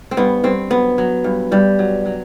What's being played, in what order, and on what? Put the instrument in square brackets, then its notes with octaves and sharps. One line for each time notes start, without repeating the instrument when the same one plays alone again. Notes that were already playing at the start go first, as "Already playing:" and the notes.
[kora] C4
G2 B3
G2 C4
F#3 B3
F#3
G2
G2 G3
F#3
F#3